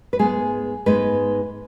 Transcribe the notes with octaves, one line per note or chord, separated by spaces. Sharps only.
B4
G#2 G#3 B3 G#4
G#2 G#3 B3 B4